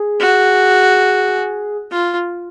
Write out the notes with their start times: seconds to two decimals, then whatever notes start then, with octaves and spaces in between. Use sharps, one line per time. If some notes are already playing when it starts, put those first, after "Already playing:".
Already playing: G#4
0.20 F#4
1.91 F4